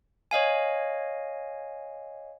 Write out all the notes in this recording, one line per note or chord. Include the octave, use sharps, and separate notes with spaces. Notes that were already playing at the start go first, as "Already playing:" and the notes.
C#5 D#5 F5 G#5